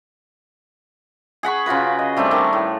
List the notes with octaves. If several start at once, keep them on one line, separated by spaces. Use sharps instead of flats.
G#4 F#5 B5 C#6
C#3 F4 F#4 B4
D#5
G3 A3 C4 D4
D#3 C#6
A2